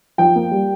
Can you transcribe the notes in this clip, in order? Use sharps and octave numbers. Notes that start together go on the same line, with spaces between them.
F3 G5
A#3
G3